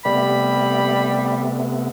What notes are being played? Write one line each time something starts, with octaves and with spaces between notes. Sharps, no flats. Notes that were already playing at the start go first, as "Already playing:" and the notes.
C3 G3 A3 B3 B5